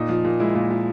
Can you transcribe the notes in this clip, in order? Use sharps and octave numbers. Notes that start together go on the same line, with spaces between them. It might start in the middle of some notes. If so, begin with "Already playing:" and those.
Already playing: A#2 D#4
F3
A#2
G#3 E4
A#2
F3